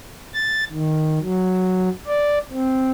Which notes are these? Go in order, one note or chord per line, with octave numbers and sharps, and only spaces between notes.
A6
D#3
F#3
D5
C4